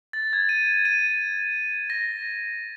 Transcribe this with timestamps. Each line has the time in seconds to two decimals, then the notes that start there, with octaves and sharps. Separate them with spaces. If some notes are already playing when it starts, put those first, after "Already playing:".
0.13 A6
0.33 G#6
0.49 D#7
0.85 D#7
1.90 A#6